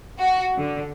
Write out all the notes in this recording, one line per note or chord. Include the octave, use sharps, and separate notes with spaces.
F#4
D3